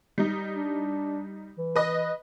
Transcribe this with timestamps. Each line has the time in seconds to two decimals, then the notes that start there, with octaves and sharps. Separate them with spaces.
0.18 G3 D#4
0.57 D4
1.58 E3
1.76 B4 D#5